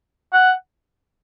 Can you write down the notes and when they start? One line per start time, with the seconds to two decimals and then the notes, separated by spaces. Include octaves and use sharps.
0.33 F#5